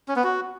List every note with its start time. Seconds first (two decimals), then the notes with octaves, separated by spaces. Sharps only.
0.08 C#4
0.16 B3
0.24 F#4